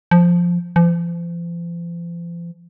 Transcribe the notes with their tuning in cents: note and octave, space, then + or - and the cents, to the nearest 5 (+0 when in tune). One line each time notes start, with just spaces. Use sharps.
F3 +0
F3 -40